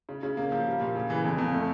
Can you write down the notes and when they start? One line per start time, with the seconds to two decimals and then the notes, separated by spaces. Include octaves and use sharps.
0.09 C#3
0.23 C#3
0.37 A#3
0.52 F3
0.67 G3
0.81 A#2
0.95 C#3
1.10 E3
1.24 F2
1.38 F2
1.53 A3